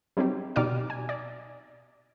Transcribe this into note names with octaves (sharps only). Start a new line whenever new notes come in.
F#3 G3 C4 D#4 G4
B2 D#4 G4 D5 D6 F6
G#5
D5